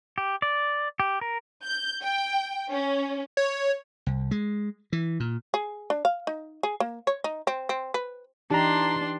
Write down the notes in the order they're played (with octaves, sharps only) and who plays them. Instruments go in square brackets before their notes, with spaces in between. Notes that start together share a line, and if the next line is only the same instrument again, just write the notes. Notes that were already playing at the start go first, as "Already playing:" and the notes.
[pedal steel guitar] G4
D5
G4
A#4
[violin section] G6
G5
C#4
[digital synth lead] C#5
[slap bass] C2
G#3
E3
A#2
[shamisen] G#4
D4
F5
D#4
G#4
A#3
C#5
D#4
C4
C4
B4
[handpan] E3 D#4 G4 [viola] D4 C6 [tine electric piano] A5 A#5